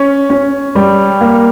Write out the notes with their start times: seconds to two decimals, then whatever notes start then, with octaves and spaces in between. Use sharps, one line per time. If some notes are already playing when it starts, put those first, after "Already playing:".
Already playing: C#4
0.30 C#4
0.75 G3
1.21 A#3